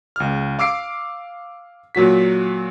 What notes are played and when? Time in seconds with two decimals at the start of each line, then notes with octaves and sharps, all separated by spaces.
0.16 C#2 F6
0.59 F5 D6 E6 C7 D7
1.95 A#2 F#3 F#4 B6